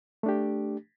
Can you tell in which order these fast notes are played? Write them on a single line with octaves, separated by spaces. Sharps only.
A3 D4 G4